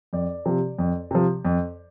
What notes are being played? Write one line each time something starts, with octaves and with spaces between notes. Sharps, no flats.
F2 D5
C3 F3
F2
C3 F3
F2